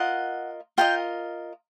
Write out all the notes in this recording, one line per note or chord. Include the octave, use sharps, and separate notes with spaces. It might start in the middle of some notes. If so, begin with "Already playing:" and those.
Already playing: F4 A#4 D#5 F#5
F4 A#4 D#5 G5